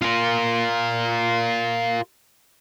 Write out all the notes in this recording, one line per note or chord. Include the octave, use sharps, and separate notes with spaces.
F4 A#4